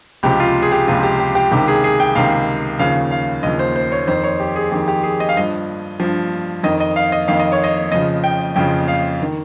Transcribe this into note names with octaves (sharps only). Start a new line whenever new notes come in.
C#2 C3 F3 G4
F4
G#4
G4
C#2 C3 F3 F4
G4
G4
G4
C#2 C3 D#3 G4
G#4
G#4
G5
C#2 C3 D#3 F5
D#2 C#3 F3 F5
F5
D#2 C#3 F3 D#5
C5
C5
C#5
F2 D#3 C5
C#5
G4
G#4
F2 D#3 G4
G4
G#4
D#5
F5
G2 F3 D#5
G2 F3
F2 D#3 D#5
D#5
F5
D#5
F2 D#3 F5
D#5
C#5
D#5
F2 C#3 F3 D#5
G5
F2 C#3 F3 G5
F5
D#3